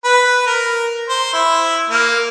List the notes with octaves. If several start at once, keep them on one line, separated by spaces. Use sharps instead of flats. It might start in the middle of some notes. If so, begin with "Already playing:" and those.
B4
A#4
C5
E4
A#3